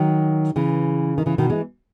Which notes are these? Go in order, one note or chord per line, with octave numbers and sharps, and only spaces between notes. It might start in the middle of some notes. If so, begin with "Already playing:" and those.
Already playing: D#3 F#3
C#3 E3
D#3
C#3 E3
B2 D#3
E3 G#3